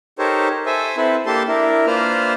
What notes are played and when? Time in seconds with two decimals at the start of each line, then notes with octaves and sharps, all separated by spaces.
0.19 D#4 G4 A4 A#4 C5 C#5
0.66 A4 C5 E5 G#5
0.97 C4 E4 A4 B4
1.26 A#3 D4 G4 A4 A5 C6
1.48 D4 E4 A#4
1.86 A#3 D4 F4 B4 C5 F6